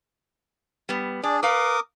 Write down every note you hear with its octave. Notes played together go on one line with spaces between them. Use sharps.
G3 B3
D4 G#4 D5
A#4 B4 F5 D6 D#6